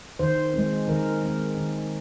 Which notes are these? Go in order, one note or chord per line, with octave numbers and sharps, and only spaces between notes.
D#3 C5
G#3 C4
D#3 A#4
G#3 C4
D#3